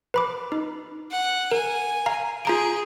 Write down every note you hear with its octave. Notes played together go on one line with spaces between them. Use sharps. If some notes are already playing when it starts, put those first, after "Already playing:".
B4 B5 D6
D#4
F#5
A#4 G#5
F5 A#5
F4 G#4 A#5 D7